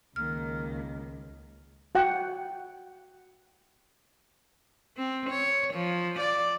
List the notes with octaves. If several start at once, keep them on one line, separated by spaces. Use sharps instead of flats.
C#2 D#3 A#3 F6
F#4 F#5 G5
C4
C#5
F3
D5